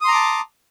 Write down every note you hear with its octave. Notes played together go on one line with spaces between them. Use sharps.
A5 A#5 C6 D6 D#6